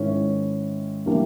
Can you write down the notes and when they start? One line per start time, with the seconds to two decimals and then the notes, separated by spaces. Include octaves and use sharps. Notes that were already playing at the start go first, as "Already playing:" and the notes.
Already playing: G#2 D#3 G#3 C#4 E4
1.06 E3 G3 A#3 D4